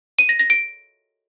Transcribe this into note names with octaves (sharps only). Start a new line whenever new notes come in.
D#7
A#6
A#6
D7